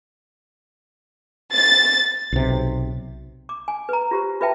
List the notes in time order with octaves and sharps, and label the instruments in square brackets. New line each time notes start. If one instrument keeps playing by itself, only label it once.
[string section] A6
[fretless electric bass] B1 C3
[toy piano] D6
G#5
B4 A#5
F4 G4 C5
F4 B4 E5 G5 A5